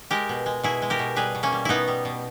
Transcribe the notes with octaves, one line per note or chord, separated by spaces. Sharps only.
G#3 G4 A#4
B2
G#3
B2 E4 G#4
G#3
G4 A#4
B2
G3 G#4 B4
B2
A#3 C#4
G3
B2 B3 D#4 E4
G3
B2